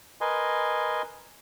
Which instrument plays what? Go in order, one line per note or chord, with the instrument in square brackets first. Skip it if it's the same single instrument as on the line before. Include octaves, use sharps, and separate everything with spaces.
[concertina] A#4 B4 D#5 G#5 C6